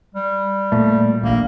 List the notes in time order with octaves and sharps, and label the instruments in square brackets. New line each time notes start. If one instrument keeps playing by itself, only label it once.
[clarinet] G3
[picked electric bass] A#2 A3
[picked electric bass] D1 A#1 [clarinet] A#3